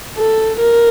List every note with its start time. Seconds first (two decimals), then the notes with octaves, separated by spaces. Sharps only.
0.18 A4
0.59 A#4